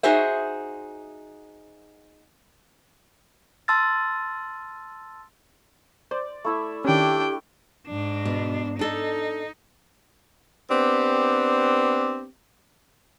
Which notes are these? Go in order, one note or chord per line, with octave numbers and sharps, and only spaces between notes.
D#4 F#4 G#4 C5 E5
A5 C6 E6 F6 A6
C5 D5
A3 E4 E5
D#3 C#4 D4 G4 G5
G#2 D4
B2
D4 D#4 A4
B3 C4 D4 G4